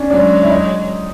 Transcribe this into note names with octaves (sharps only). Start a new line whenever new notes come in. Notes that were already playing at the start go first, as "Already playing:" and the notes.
Already playing: C#4 D4
F#3 G#3 D4
E4
D#4